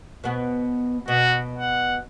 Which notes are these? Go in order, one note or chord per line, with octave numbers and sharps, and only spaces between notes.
B2 B3
B2 F#4
F#5